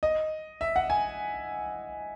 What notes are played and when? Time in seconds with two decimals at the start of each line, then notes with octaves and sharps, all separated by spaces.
0.03 D#5
0.61 E5
0.76 F#5
0.90 G#5